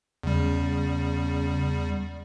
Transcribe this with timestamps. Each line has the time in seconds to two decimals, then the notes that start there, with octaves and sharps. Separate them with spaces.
0.23 E2 C#3 G3